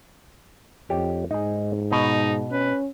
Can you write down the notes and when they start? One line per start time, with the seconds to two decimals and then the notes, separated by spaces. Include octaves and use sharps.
0.90 F2 G4 C#5 D#5
1.31 G#2 D#4 G#4
1.92 B2 D#4
2.51 C#4 B4